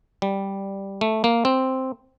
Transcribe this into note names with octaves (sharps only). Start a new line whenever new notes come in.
G3
A3
A#3
C4